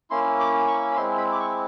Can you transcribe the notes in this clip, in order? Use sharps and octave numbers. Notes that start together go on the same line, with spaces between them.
A#3 C#4 E4 C6
D6
C#6
B5
G#3 C4 E4 C6
B5
D6
C#6